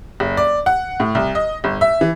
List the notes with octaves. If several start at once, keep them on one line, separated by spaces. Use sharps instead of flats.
F#1
D5
F#5
A2
C2
D#5
G1
E5
E3